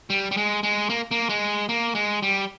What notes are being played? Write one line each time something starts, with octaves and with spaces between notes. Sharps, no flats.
G3
G3
G#3
G#3
A#3
A#3
G#3
A#3
G#3
G3